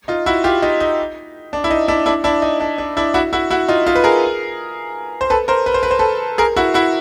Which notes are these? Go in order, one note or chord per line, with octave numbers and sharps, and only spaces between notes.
D#4 F4
E4 F#4
F4 G4
D#4 F4
D#4
D4
E4
D#4
D4 E4
D4 E4
D4 E4
D#4
D4
D4
D4 E4
E4 F#4
E4 F#4
E4 F#4
D#4 F4
D#4 F4
B4
G#4 A#4
C5
A4 B4
A#4 C5
B4
C5
B4
C5
A4 B4
G#4 A#4
E4 F#4
E4 F#4